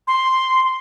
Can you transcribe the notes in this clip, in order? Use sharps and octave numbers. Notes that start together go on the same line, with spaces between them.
C6